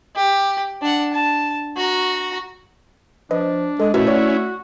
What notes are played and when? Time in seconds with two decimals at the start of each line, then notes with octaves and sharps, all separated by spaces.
0.16 G4
0.82 D4 F#5
1.13 A5
1.77 F#4 A#5
3.31 F3 D4 B4 D#5
3.80 G#3 A4
3.94 B2 A3 C#4 E4 F#4 A#4 B4
4.07 F#4 B4 C#5 D5